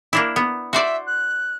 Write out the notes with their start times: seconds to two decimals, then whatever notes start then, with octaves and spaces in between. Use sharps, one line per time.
0.13 A#3 D4 E4
0.36 B3
0.73 F#4 C5 D5 E5
1.07 F#6